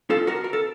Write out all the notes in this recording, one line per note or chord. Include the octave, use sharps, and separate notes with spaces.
F4 A4
F#4 A#4
A#4
A4